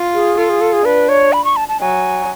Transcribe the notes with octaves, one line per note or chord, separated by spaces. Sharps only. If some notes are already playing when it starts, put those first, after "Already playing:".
Already playing: F4
G#4
F4 A4
G#4
A4
G#4
D4 B4
C#5
B5
C#6
A5
A5
F#3 G#5